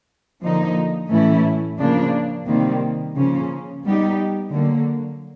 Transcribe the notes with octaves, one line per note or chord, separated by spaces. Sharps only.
D3 F3 A#3 D#4
A2 E3 A3 C#4 E4
C#3 F3 A#3 D4
C3 D#3 G3 A#3
C#3 F3 A#3 C#4
G3 B3 D#4 G4
D3 F#3 A#3